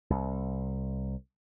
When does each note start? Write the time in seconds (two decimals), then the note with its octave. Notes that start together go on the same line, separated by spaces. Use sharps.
0.10 C2